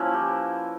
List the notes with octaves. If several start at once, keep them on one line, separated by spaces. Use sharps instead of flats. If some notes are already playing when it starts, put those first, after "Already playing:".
Already playing: F3 A#3 C#4 E4 B4
G4